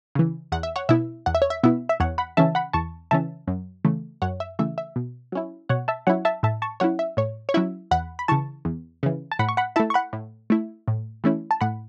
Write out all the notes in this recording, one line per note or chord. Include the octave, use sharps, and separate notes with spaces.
C#3 E3
E2 F#5
E5
C#5 F#5
B2 B3 E4 E5
E2 F#5
E5
C#5
E5
B2 B3 E4 E5
E5
E2 C#5 F#5
F#5 B5
C#3 E3 C#4 E5 A5
F#5 B5
E2 A5 C#6
C#3 E3 C#4 E5 A5
F#2
C#3 E3 A3
F#2 C#5 F#5
E5
C#3 E3 A3 E5
E5
B2
F#3 C#4 E4
B2 C#5 F#5
E5 A5
F#3 C#4 E4 C#5 F#5
E5 A5
A2 E5 A5
A5 C#6
F#3 C#4 E4 C#5 F#5
E5
A2 C#5
C#5
F#3 C#4 E4 E5
E2 F#5 B5
B5
C#3 E3 A5 C#6
E2
C#3 E3
A5
A2 F#5 B5
C#6
F#5 B5
A3 E4 E5 A5
C#6
F#5 B5
A2
A3 E4
A2
E3 A3 C#4 E4
A5
A2 F#5 B5